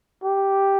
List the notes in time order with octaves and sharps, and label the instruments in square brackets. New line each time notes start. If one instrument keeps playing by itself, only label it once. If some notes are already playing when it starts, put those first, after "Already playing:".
[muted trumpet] G4